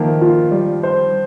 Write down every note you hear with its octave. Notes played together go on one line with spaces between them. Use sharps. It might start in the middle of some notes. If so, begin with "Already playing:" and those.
Already playing: D#3 F3 A#3
F4
G3
C5